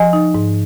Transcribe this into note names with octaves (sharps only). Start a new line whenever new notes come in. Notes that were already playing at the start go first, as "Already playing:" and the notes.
Already playing: F3 D#5 G#5
D#4
G#2